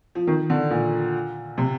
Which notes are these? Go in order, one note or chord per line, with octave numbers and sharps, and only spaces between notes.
F3
D#3
D3
A#2
C3